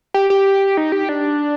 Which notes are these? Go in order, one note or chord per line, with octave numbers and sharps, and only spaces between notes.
G4
G4
D#4
G4
D4